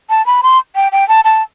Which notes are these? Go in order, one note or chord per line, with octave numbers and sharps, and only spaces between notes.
A5
B5
C6
G5
G5
A5
A5